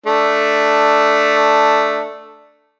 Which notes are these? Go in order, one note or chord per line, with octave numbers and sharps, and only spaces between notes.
A3 D4